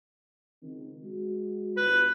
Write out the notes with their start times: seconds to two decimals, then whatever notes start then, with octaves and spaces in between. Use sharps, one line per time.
0.63 C#2 D#3 C4
1.03 G#3 F#4
1.77 G1 B4